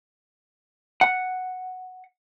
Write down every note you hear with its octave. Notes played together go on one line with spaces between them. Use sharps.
F#5